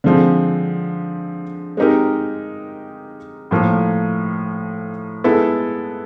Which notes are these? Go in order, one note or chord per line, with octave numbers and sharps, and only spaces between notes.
D3 F3 G#3 C4
G#3 C4 D#4 G4 A#4
A2 F3 A#3
G#3 B3 E4 A4